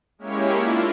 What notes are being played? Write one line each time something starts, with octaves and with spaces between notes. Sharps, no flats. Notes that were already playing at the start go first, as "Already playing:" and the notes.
G#3 A#3 C#4 E4 G4 C#5
A#3 D4 E4 F4